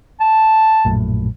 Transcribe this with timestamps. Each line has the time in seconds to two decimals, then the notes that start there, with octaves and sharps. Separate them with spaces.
0.21 A5
0.85 A#1 F#2 A2